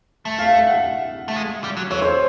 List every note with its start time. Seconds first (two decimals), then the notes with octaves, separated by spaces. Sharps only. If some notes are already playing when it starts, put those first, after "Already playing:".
0.25 A3
0.39 F5
0.53 E5
0.67 F#5
1.28 A3
1.36 G#3
1.64 G3
1.77 F#3
1.91 E3 C#5
2.02 C5